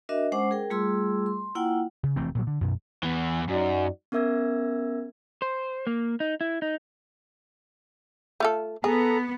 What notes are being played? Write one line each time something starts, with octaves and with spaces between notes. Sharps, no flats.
D4 F#4 A#4 D#5 E5
G#3 C#4 C5 F#5 D6
G#4 A#4 G5
G3 A3 F4 G#4 C6 E6
C6
A#3 E4 F4 F#5 G5
C#3
F1 E3 A3 C4
A#2 F3 F#3
D3
F#2 B2
E2 E3
F#2 D#4 F#4 D5
B3 C#4 A#4 E5 E6 G#6
C5
A#3
D#4
E4
D#4
A3 F4 A4
B3 G#4 A4 A#5